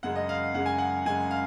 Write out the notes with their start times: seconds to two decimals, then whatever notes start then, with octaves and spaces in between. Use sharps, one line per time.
0.03 F#2 C#3 G#3 F#5
0.15 D#5
0.29 F5
0.54 F#2 C#3 G#3 F#5
0.66 G#5
0.78 F#5
1.05 F#2 C#3 G#3 G#5
1.31 F5